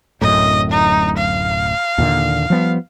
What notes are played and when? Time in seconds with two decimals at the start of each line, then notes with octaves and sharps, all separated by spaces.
0.21 D1 F#2 A2 D#5
0.71 D#4
1.18 F5
1.98 D#2 A#2 D3
2.50 F3 G3 B3